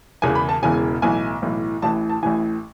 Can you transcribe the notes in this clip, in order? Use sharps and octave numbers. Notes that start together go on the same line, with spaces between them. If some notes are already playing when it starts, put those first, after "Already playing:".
E1 E2 C#3 E3 G#5
B5
A5
E1 E2 C#3 E3 G#5
B1 A2 E3 G#5
B1 A2 E3
A1 A2 E3 A5
A5
A1 A2 E3 G#5